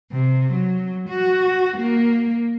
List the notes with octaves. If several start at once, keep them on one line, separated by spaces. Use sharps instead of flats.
C3
F#3
F#4
A#3